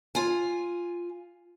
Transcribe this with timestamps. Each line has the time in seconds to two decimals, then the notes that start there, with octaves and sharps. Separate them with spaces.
0.15 F4 G#5